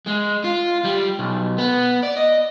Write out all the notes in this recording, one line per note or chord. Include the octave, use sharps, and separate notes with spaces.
G#3
F4
G3
B1
B3
D5
D#5